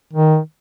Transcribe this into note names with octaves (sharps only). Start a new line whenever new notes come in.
D#3